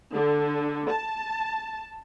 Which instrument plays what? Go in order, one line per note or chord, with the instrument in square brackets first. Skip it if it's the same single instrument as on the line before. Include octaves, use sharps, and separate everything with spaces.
[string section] D3
A5